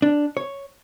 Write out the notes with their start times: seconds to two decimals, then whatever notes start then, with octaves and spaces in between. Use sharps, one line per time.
0.02 D4
0.37 C#5